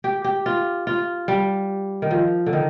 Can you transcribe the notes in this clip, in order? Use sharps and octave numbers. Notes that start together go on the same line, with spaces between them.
G4
G4
F4
F4
G3
D#3
F3
D3
D#3